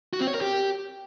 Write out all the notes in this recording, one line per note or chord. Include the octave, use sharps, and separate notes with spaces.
F#4
C4
C#5
A#4
G4